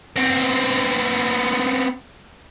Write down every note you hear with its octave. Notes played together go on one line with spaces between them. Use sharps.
B3 C4